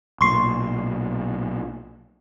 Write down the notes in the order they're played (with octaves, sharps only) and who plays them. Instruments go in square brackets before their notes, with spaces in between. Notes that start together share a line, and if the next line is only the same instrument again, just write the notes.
[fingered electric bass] B1 A#2 [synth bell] C6 C#6 C7